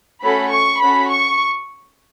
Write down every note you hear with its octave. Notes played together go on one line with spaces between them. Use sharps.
A3 C#4 F#4 A4 B5
C#6
C#4 F#4 A4 B5
C#6